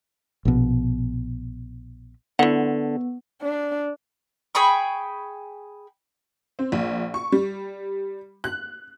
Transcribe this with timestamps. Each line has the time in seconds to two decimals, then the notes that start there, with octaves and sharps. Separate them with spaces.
0.45 A#1 B2
2.39 D3 B3 E4 F#5
3.42 D4
4.55 G#4 G5 B5 C#6
6.59 C4
6.72 A#1
7.14 C#6
7.32 G3
8.44 F#6